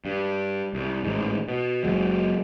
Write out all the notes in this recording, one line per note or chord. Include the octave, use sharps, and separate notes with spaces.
G2
C2
A1 G#2
B2
F#1 F#2 F#3 G#3